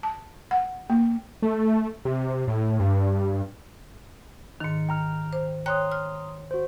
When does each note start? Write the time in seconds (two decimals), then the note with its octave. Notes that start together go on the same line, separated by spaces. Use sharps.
0.03 A5
0.51 F#5
0.90 A#3
1.42 A3
2.05 C3
2.47 A2
2.80 G2
4.60 G#2 D#3 D#4 C#7
4.89 G5 A#5 F6
5.33 C5
5.66 C#5 G5 A#5 C6 D#6 F#6
5.92 F6
6.51 F#4 C5